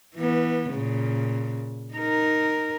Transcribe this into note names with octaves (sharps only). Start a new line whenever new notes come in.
E3 B3
A#2 C#3
D#4 A#4